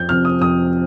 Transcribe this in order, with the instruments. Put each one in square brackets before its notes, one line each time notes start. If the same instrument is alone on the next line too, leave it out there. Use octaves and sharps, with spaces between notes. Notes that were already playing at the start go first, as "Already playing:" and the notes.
Already playing: [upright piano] F2 G6
C3 F3 C4 F6
D#6
F2 D#6